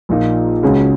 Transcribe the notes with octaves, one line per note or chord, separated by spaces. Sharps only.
A#1 A#2 A#3 D#4
C#2 C#3 G#3 C#4 F#4